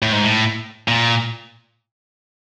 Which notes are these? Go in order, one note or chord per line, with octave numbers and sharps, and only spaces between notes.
A2
G#2
A2
A#2